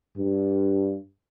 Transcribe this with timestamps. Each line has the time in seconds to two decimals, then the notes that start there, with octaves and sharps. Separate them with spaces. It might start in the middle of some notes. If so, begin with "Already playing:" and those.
0.17 G2